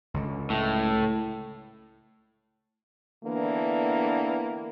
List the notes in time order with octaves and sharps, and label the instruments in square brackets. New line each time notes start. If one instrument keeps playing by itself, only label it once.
[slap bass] C#2 D3
[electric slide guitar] A2
[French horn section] D3 E3 A#3 B3 D4